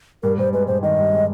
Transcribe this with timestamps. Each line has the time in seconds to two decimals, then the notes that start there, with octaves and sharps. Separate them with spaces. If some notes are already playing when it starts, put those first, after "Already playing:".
0.23 G2 A#4
0.38 G2 C5
0.53 G#3 B4
0.67 G2 C5
0.83 D#3 D#5
0.98 G2
1.12 G#3